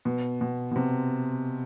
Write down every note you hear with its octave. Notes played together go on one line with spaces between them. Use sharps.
B2
B2
B2
C3